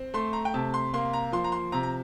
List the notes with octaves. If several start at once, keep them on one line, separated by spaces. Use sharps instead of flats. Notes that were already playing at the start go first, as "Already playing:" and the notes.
Already playing: C4
A3 C6
A#5
G5
C3 A5
C6
A#3 C6
A#5
F3 C6
A#5
C6
C3 A#5
A#5